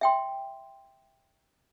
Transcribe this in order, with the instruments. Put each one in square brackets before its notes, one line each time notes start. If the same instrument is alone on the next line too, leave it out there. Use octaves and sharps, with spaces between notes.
[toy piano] E5 G5 C6